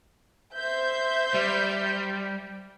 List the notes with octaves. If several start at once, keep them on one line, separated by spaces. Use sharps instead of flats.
C5 E5 G6
G3